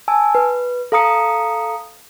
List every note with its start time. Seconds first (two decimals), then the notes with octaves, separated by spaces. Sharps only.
0.08 G#5 A5 E6
0.35 B4
0.92 A4 F5 A#5 D#6 C#7